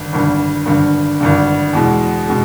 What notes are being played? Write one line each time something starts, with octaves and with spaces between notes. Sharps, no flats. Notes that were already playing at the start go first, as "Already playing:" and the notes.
Already playing: G#1 G2 D3
G#1 G2 D3
G#1 G2 D3
G#1 G2 D3
E2 B2 G#3
B2 G#3